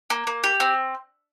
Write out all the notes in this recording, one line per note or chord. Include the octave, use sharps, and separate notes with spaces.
A#3
A#3
G4
C4